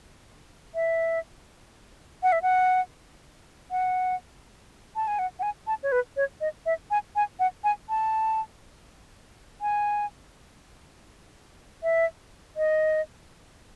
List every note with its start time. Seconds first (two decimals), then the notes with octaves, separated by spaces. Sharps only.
0.75 E5
2.23 F#5
2.32 E5
2.42 F#5
3.71 F#5
4.96 A5
5.08 G#5
5.19 F#5
5.39 F#5
5.43 G#5
5.67 A5
5.83 C#5
5.92 B4
6.17 C#5
6.41 D#5
6.66 E5
6.91 G#5
7.16 G#5
7.39 F#5
7.64 G#5
7.89 A5
9.61 G#5
11.83 E5
12.57 D#5